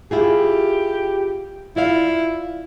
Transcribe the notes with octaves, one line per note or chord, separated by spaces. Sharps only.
E4 F4 G4 G#4
E4 F4 D5 F5